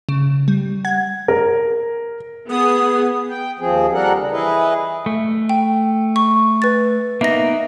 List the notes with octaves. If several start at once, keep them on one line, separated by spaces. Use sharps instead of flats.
C#3
G3
F#5 G#6
A#4
B3 G#4 D#6
G5
D#2 F3 C4 G#4
G3 D4 A4 A#4 F#5
C#3
E3 E4 G#4 B4 D#5
A3
G5
C#6
B4 A6
A#3 B3 D#4 E5 A#6